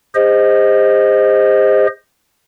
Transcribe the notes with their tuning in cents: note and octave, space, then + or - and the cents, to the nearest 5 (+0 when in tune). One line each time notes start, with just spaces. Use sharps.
G#4 -45 C5 +0 D#5 +5